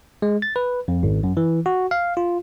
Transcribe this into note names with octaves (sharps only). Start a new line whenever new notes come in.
G#3
A6
B4
F2
G#1
F#2
E3
F#4
F5
F4